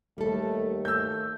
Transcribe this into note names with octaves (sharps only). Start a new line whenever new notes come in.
D#2 G3 A3 A4
A3 E6 G6